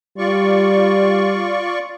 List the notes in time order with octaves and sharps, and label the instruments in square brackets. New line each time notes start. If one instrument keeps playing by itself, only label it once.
[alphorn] G3 [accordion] F4 D5 C#6